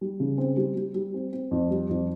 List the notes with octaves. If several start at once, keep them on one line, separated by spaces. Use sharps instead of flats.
G3
C#3
C4
G3
G3
G3
C4
C4
F2
G3
F2